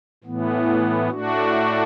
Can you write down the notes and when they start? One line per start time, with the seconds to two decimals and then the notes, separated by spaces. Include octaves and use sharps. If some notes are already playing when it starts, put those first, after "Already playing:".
0.24 A2 E3 B3
1.10 A2 A3 D4 F#4